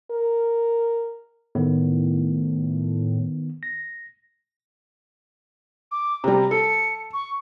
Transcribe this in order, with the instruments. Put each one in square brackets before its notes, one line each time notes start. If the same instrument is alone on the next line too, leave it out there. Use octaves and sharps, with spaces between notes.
[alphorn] A#4
[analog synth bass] A2 [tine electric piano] D#3 B3
[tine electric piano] A#6
[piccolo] D6
[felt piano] C3 G3 [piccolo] A#5
[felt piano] A4 [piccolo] C#7
[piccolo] C#6